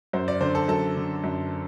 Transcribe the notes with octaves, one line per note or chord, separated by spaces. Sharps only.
F#2 C5
D5
D3 C5
A4
F#2 A4
D3
F#2